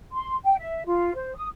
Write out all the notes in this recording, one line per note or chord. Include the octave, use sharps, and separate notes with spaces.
C6
G5
E5
F4
C5
D#6